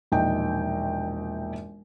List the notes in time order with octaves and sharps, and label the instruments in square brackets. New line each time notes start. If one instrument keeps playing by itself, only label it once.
[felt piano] E1 A#1 D#4 G5